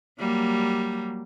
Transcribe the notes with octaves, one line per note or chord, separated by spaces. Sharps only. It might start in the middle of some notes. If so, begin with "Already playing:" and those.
F#3 G3 A#3